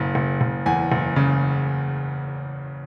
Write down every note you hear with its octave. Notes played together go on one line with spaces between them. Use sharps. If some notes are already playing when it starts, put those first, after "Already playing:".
Already playing: F#1 C#3
F#1
F#1
E2 G#5
F#1
C#3